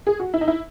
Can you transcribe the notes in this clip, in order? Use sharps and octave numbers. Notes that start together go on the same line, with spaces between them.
G#4
F#4
E4
D#4
E4